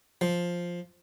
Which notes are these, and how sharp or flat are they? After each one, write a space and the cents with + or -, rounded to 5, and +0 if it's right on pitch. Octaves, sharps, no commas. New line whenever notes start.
F3 +5